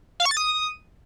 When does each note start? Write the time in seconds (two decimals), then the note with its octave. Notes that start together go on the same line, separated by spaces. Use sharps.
0.20 F5
0.25 C#6
0.31 A6
0.37 D#6